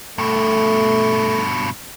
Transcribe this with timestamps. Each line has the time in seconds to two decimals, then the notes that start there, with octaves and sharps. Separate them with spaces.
0.18 G2 B2 A3